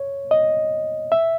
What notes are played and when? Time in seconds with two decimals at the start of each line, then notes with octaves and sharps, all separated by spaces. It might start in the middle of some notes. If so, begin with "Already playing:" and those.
Already playing: C#5
0.31 D#5
1.12 E5